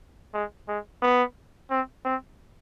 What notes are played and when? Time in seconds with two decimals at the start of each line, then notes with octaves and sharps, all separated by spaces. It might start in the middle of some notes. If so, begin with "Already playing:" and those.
0.34 G#3
0.68 G#3
1.02 B3
1.71 C4
2.05 C4